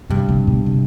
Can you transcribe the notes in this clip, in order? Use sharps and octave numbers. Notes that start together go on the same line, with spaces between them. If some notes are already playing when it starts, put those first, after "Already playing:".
G2 C3
C3
B2
C3